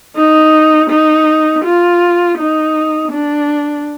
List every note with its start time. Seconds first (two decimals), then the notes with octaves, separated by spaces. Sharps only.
0.16 D#4
0.90 D#4
1.64 F4
2.39 D#4
3.12 D4